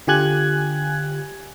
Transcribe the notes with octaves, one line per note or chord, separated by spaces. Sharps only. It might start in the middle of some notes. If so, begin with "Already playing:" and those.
D3 F4 G4 G#5 F#6 G#6